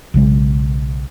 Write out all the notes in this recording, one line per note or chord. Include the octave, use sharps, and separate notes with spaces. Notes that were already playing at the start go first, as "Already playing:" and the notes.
B1 C#3 G#3